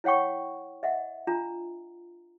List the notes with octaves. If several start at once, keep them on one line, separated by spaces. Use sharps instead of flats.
E4 C#5 F#5 G5 C#6
D#5 E5 F#5
D4 F4 A#5